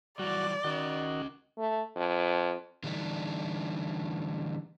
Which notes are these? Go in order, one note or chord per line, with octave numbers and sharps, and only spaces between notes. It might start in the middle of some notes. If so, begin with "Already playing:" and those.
E3 F#3 G3 F#4 D5
D#3 C#4 F#4 D#5
A3
F2
D3 E3 G3 A3 D4 D#4